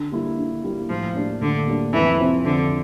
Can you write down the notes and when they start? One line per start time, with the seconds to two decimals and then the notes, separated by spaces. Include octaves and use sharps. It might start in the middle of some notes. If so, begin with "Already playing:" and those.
Already playing: D3
0.12 G3 A#3 E4
0.38 D3
0.64 G3 A#3 E4
0.89 A2 F3
1.15 G3 A#3 D4
1.41 A2 D3
1.67 G3 A#3 D4
1.93 F2 E3
2.19 C3 F3 C4
2.45 F2 D3